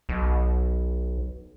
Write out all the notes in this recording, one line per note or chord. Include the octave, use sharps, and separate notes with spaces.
B1